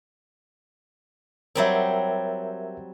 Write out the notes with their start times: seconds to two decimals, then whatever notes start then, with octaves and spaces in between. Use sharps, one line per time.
1.55 F#3 G3 C4 A#4 E5